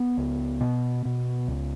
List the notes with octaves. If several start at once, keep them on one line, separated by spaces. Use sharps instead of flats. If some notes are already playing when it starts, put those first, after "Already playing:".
Already playing: B3
C#2
B2
B2
C#2